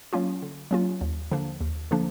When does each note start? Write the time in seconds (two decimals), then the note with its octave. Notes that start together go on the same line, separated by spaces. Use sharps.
0.13 F#3 A#3 C#4 F4
0.42 D3
0.71 F#3 A#3 C#4 F4
1.01 D#2
1.31 D3 F3 A#3 D4
1.61 D#2
1.91 D3 F3 A#3 D4